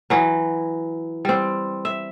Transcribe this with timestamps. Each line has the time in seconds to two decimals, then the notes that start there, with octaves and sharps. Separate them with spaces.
0.10 E3 F#3
1.25 G3 C4
1.85 E5